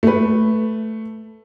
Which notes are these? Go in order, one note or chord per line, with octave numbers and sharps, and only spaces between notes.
A3 B4